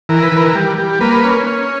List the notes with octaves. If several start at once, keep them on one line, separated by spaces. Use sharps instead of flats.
E3 A#4
B4
E3 A#4
G3
G3
A#3 B4
C#4
C#4